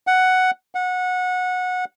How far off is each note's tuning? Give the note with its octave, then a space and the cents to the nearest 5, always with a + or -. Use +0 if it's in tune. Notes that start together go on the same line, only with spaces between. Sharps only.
F#5 +5
F#5 -20